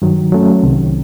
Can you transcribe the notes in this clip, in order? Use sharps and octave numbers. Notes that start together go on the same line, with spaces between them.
G2 D#3 F#3
F#3 A3 C#4
C2 C3 D#3